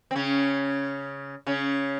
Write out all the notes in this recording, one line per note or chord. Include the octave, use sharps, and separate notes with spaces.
C4
C#3 C#4
C#3 C#4